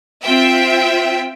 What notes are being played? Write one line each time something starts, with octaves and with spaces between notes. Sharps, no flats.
C4 F4 E5 G5